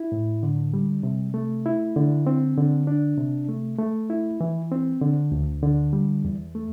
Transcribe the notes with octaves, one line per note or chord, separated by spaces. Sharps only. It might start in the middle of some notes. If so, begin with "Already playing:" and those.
Already playing: E4
A2
D3
G3
C3
A3
E4
D3
C4
D3
D4
C3
A3
A3
E4
E3
C4
D3
D2
D3
G3
E2
A3